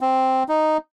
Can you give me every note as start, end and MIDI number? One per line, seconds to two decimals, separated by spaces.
0.01 0.43 60
0.49 0.77 63